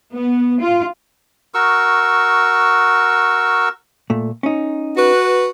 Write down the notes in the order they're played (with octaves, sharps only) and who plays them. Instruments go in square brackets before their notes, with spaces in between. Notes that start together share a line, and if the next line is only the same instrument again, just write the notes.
[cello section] B3
F4
[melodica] F#4 A#4 C#6 E6
[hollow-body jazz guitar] A#2 A3
C#4 D#4
[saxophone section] F#4 B4